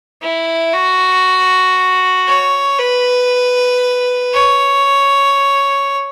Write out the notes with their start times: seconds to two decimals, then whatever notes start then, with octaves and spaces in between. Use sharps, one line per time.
0.22 E4
0.73 F#4
2.28 C#5
2.79 B4
4.33 C#5